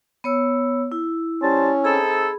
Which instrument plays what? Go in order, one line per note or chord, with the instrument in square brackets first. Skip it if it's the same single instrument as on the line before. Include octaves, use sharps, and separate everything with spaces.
[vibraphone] B3 C#5 E6
E4
[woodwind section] G3 C5 A5 [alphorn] C#4
[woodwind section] C4 D#4 A4 [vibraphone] G#4 B5